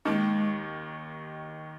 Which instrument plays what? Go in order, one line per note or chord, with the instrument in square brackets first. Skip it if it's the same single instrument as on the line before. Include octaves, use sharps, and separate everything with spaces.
[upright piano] D#2 D#3 [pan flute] G#3